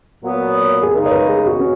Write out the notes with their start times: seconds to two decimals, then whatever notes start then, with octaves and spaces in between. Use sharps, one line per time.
0.22 A#2 F#3 B3
0.82 G#4
0.93 C#3 G#3 D#4 A#4
1.06 C#5
1.11 B4
1.29 G#4
1.46 F#4
1.60 C#4